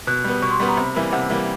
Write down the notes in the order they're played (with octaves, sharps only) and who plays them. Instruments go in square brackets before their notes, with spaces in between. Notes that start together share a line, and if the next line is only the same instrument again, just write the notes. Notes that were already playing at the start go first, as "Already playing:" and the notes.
[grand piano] B2 [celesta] F#6
[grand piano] G3 B3
[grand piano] B2 [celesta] C#6
[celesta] C6
[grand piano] G3 B3 [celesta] B5
[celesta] A#5
[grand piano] C3 [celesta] B5
[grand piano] E3 G3 A#3
[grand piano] C3 [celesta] F#5
[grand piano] E3 G3 A#3